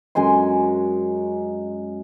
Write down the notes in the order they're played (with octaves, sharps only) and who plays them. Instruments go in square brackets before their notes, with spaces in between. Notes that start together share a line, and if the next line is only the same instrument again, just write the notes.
[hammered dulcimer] F#2 G#3 G#5 C6